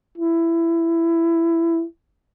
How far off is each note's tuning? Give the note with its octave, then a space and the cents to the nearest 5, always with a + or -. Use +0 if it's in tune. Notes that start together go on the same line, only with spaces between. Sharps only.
E4 +15